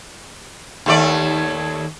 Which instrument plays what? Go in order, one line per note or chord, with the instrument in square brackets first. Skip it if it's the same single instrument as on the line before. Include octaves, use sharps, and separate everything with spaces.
[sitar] D#2 A3 D5